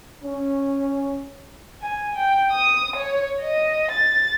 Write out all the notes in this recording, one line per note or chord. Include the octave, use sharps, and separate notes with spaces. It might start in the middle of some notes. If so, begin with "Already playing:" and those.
C#4
G#5
G5
D#6
C#5
D#5
A6